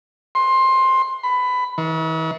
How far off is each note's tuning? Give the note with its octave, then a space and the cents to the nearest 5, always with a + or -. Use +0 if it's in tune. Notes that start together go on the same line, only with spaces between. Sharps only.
C6 +15
B5 +15
E3 -45